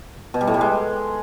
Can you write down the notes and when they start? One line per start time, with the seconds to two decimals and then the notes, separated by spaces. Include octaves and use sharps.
0.34 B2
0.41 G3
0.47 A2
0.54 G3
0.61 G#3